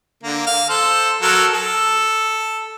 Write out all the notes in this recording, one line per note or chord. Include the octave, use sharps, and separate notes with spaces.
D3 A#3
F5
A4 C5
F#3 A4 A#4
A4